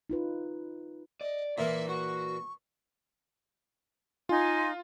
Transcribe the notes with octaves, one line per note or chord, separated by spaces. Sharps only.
D#4 F4 B4
D5 D#5
A#2 E3 A#3 E4 E5
F#4 C#6
D#4 F4 G#5 C6